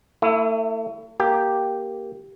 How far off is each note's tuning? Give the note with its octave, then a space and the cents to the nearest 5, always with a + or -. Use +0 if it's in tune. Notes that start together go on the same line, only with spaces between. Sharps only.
A3 +35 E4 +0
A#3 +0 G4 +0